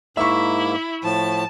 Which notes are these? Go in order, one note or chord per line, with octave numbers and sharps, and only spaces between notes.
G#2 A#3 E4 E5 C#6
A2 F3 A5